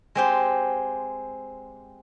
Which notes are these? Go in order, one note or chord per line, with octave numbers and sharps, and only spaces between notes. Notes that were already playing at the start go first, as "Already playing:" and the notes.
G#3 C4 G4